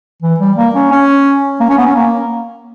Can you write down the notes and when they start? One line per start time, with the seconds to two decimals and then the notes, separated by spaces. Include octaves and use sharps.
0.23 E3
0.40 G3
0.57 A#3
0.75 C#4
0.91 C#4
1.60 A#3
1.70 C#4
1.78 B3
1.86 C#4
1.95 A#3